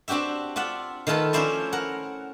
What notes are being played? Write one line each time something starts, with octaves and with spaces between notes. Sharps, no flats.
C4 D4 F#4 G4 E5
F4 D5 E5 F#5
D#3 A3 F4 A4 B4
F3 C#4 E4 C5 D5 E5
A#4 F#5